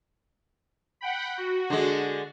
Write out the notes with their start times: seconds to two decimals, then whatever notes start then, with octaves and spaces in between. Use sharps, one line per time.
1.01 F#5 G5 B5
1.38 F#4
1.70 D3 G#3